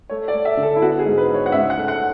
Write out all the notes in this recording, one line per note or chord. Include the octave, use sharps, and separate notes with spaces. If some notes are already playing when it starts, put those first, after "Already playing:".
A3 C#5
D5
A3
E5
D3
A4
E4
B3 F#4
G#4
G#2
B4
G#2
C#5
F#5
C#2 E5
F#5
A3
F#5